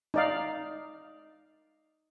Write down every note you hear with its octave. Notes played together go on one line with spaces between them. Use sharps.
D#4 D5 F5